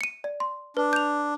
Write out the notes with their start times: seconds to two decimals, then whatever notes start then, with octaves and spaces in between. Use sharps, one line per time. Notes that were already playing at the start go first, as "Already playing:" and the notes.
0.01 C#7 D#7
0.24 D5
0.40 C6
0.77 D4 B4
0.93 G6 F7